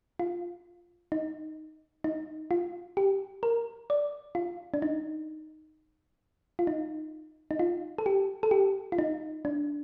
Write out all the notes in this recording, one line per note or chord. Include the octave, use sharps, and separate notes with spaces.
F4
D#4
D#4
F4
G4
A#4
D5
F4
D4
D#4
F4
D#4
D#4
F4
A4
G4
A4
G4
F4
D#4
D4